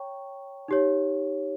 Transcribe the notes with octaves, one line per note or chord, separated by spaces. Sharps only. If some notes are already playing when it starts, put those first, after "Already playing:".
Already playing: C#5 G5 A#5 C#6
D#4 G4 C#5